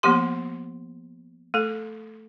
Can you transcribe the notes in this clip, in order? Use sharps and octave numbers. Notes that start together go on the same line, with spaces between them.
F3 A#3 B3 G4 C6
A3 A4